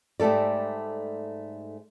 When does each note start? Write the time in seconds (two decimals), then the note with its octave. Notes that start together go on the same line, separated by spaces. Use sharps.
0.20 G#2 G3 A3 A4 D5